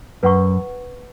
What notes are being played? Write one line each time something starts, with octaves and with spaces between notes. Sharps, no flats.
F#2 B4 F#5 C#6